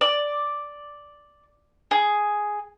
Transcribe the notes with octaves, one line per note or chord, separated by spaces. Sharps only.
D5
G#4